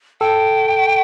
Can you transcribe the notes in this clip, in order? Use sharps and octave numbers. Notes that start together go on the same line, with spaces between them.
A4 G5